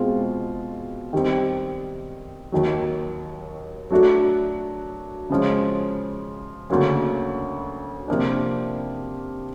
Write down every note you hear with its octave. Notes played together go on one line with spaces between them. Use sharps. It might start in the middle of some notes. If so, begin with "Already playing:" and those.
Already playing: B2 G#3 C4 F4 G#4
D#3 G3 C4
D#2 D#3 F#3
F#3 A3 D4 F#4
C#3 F3 G#3 C#4
D2 C#3 F#3 A#3 C#4
C3 F3 A#3 D4